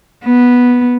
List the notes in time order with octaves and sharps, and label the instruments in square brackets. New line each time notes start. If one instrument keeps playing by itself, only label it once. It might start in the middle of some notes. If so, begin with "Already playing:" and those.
[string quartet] B3